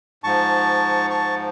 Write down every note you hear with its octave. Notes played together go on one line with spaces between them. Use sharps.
G#2 F3 A5 C#6
A5 C#6